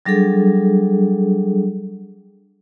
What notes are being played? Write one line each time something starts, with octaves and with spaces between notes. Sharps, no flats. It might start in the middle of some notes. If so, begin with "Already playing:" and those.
F#3 G3 D4 G#4 A4